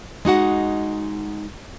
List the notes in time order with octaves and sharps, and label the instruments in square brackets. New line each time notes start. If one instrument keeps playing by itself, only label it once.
[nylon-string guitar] G#3 D#4 F#4 F#5